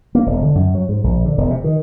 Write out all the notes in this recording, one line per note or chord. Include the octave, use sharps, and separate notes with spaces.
A#3
E1
D3
F#2
F#3
G#2
A#1
D3
E1
C3
D#3